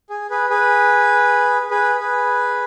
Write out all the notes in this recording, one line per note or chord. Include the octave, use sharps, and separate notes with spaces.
G#4
G#4 B4
G#4 B4
G#4 B4
G#4 B4